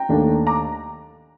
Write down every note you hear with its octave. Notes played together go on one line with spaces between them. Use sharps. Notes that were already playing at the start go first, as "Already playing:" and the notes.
Already playing: G5 A#5
D#2 D#3 A3 D4
A#5 D6